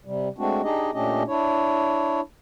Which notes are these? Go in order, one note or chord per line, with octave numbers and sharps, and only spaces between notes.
C3 G3
G#3 A3 C4 D4 F#4
D4 D#4 G4 G#4 D#5
A#2 A3 C#4 D4 G4 D#5
D4 E4 C#5